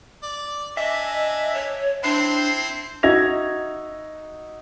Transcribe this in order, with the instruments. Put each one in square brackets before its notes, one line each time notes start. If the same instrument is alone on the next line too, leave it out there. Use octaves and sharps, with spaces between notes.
[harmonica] D5
[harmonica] D4 G#5 [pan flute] D#5 [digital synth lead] E5
[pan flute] C#5
[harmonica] C4 E4 C5 [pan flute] D4 [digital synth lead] C7
[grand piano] D#4 F#4 E5 G#6 A#6 F7